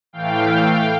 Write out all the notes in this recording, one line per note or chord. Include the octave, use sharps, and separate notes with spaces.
A2 E3 A3 F5 G5